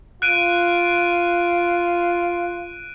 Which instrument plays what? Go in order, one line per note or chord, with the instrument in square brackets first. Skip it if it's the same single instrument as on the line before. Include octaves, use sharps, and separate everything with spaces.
[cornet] F4 [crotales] F#6 D7 D#7